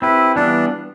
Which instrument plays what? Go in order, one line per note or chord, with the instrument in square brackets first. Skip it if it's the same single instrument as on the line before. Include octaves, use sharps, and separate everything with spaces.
[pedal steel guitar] C4 G4 B4 [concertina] E4
[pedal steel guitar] E3 G3 B3 F4 [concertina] D4